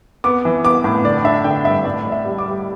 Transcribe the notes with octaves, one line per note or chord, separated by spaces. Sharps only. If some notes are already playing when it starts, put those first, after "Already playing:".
B3 D6
E3
B3 D6
A2
D3 D5
D4 E5
D3 G5
G2 E5
A2 D5
A1
E5
G3
D6
G3